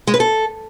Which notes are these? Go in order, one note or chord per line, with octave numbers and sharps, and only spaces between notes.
G#3
B4
A4